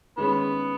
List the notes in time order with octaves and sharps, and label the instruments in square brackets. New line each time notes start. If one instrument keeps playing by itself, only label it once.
[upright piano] D#3 G#3 C#4 G#4 [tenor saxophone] B3